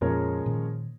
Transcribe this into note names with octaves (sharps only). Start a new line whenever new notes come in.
F2 A#2 F3 G#3 C#4 A#4 C#5
A#2 D#3